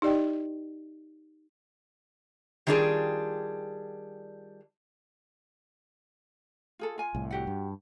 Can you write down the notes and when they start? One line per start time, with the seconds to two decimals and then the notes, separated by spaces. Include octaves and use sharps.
0.02 D#4 G4 D5 D#5 G5
2.67 D#3 G3 D4 F4 G#4
6.79 F4 G#4 A4
6.98 F4 G#5
7.15 C2 A2
7.31 F#4 G4 F#5
7.47 G2